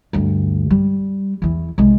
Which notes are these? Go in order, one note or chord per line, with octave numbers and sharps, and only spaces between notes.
D2 G2
G3
E2 E3
C2 G#3